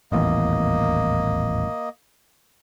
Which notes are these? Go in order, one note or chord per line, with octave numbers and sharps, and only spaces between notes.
D#1 A1 E2 A#3 D#5